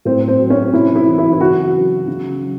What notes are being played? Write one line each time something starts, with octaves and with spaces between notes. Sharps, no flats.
A2 C4
C4
F#3
C#4
C3 E4
E4
E3
E4
E4
C#3 F#4
F#3
C#3
F#3